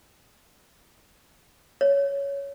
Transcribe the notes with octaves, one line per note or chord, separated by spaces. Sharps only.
C#5